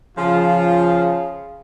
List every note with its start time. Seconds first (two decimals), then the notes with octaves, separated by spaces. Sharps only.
0.17 C#3 F3 F4